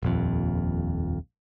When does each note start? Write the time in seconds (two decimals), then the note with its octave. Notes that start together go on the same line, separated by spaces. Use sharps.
0.03 D#1 A#1 F2